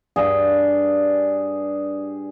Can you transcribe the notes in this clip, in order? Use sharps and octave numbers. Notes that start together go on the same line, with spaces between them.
G2 G#4